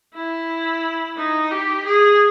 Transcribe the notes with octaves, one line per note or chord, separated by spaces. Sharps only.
E4
D#4
G4
G#4